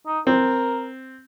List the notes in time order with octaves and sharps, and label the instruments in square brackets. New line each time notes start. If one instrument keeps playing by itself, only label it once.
[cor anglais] D#4
[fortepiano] C4 [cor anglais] A#4